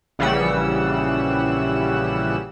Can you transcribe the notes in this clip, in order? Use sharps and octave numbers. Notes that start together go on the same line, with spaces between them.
A#1 C#3 E3 G3 F#5 E6